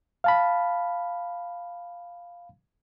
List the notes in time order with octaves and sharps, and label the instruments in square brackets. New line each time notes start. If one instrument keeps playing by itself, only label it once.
[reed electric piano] F5 A5 B5